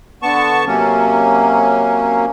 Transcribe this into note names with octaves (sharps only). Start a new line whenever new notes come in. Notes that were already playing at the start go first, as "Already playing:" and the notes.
D3 B3 A5 C#6
C3 F#3 A#3 C#4